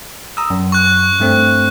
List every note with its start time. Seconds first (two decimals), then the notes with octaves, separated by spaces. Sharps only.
0.37 A#5 D#6 E6
0.50 F#2
0.72 C#6 F#6
1.20 G2 A3 C4